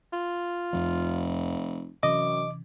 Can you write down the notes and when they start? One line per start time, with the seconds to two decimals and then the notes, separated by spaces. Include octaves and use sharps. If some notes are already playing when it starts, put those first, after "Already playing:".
0.13 F4
0.73 F1 F2 F3
2.03 F#2 C3 E3 C#4 D#5 D6